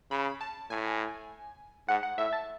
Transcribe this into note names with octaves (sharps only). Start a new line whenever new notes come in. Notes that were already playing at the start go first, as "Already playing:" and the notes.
C#3 B5
A5
A2 G#5
G#2 F#5
F#5
A2 E5
A5